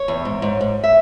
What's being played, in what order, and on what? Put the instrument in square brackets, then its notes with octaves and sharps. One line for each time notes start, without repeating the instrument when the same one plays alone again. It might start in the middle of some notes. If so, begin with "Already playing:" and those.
Already playing: [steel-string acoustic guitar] C#5
E2
G#2
G#2
G#2
E5